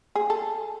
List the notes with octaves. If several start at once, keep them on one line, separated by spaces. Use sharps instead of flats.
G#4
A4